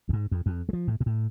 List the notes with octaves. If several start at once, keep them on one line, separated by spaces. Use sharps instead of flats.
F2
G#2
F2
F2
G#3
F3
A2
B2
A2